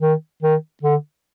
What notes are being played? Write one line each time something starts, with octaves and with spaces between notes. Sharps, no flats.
D#3
D#3
D3